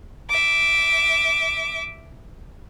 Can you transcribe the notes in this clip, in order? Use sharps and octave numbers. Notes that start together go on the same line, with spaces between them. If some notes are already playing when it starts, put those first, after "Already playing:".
E5 D6